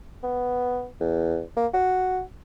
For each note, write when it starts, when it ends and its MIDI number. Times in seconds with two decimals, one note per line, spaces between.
0.23 0.87 59
1.00 1.42 40
1.56 1.67 58
1.74 2.21 66